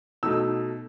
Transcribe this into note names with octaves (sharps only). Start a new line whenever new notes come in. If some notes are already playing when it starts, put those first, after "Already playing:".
B2 A3 D#4 E6